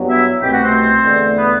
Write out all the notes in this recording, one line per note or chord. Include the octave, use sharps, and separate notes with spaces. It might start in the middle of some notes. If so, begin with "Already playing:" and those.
Already playing: G2 F#3 B3
E4 E5
C2 B2 A3 C4 G4 G5
F#4 F#5
C4 C5
E2 D3 A3
B3 B4